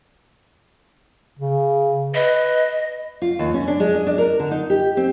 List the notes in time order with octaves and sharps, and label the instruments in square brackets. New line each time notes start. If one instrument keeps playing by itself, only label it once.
[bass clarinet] C#3
[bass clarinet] B4 [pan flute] D#5
[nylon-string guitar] F4
D#2
C#4
D4
G#3
D#5
D4
A#4
D3
D#4
G4
C4